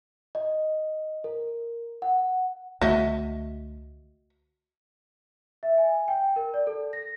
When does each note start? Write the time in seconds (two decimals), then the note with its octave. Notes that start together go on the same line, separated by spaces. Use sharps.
0.35 D#5
1.24 A#4
2.02 F#5
2.81 C#2 D3 A3 F#4 D#5 E5
5.63 E5
5.78 G#5
6.08 G5
6.36 A#4
6.54 D5
6.67 A4
6.93 A#6